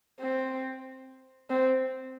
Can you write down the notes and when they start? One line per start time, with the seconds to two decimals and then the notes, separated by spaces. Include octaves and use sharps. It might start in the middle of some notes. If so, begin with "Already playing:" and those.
0.20 C4
1.50 C4